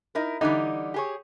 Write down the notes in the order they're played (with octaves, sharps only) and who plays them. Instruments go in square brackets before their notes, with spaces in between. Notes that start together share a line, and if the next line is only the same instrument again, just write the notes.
[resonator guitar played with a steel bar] D#4 E4 A#4
[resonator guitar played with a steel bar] D3 E3 G3 [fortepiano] D#4
[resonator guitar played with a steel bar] G4 G#4 C#5